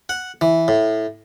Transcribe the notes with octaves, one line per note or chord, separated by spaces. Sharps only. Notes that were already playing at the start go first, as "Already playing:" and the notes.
F#5
E3
A2